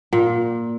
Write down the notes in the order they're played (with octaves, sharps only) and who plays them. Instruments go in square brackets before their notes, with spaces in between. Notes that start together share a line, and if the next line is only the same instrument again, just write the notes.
[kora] A#2